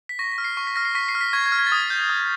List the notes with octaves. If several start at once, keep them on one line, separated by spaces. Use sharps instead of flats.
B6
C#6 A#6
B6
F6
C7
C#6
B6
F6 A#6
C7
C#6 B6
C7
F6
B6
C#6 G#6
G#6
F6
G#6
A6
D#6 G#6
G6
D#6